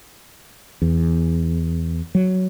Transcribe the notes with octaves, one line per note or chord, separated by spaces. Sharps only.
E2
F#3